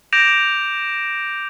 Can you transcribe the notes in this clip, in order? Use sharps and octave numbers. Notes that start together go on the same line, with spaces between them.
D6 G6 A#6 D7 E7 F7